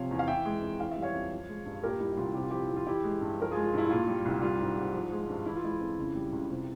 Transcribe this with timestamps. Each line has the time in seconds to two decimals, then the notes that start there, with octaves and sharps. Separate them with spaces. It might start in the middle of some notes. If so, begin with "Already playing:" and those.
Already playing: C3 F3 C#5 F5
0.11 E2
0.19 F5
0.28 E3 E5 G5
0.45 G#3
0.62 F2
0.80 E3 F5
0.91 G3 E5
1.02 C#5 F5
1.14 F2
1.31 F3
1.48 G#3
1.65 G2
1.83 A#2 G4 A#4
2.00 G3 E4
2.12 E4
2.17 C2 F4
2.35 C3 G4
2.43 F4
2.50 F3 E4 G4
2.69 F2
2.76 F4
2.86 E3 E4 G4
3.04 G#3
3.21 G2
3.39 F3 A#4
3.51 F4 G#4
3.56 G#3
3.64 F4
3.74 G2 E4
3.90 A#2 F4
4.07 G3
4.26 C2
4.42 G3 F4
4.60 G#2
4.77 G#2
4.94 F3
5.12 G#3
5.29 G2
5.46 E3 E4
5.56 F4
5.63 G#3 E4
5.80 F2
5.98 C#3
6.15 G3
6.33 C#2
6.50 C3